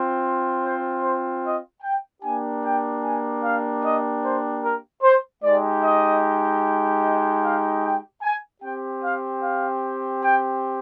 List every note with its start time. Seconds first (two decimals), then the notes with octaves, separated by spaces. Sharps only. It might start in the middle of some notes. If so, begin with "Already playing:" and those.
Already playing: C4 F4
0.64 C5
1.03 C5
1.44 D#5
1.83 G5
2.23 A#3 D4 G4 G#5
2.63 G5
3.03 G#5
3.43 F5
3.83 D#5
4.24 C5
4.62 A#4
5.03 C5
5.43 G#3 D#4 G4 D5
5.83 D#5
7.03 D#5
7.43 F5
7.83 G5
8.22 G#5
8.62 C4 G4 G5
9.03 F5
9.42 F5
10.22 G5